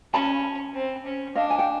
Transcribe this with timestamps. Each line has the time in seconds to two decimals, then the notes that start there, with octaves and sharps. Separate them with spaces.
0.14 C#4 A5 B5
0.74 C4
1.06 C#4
1.35 D4 D#5 F5
1.50 G#5
1.59 G5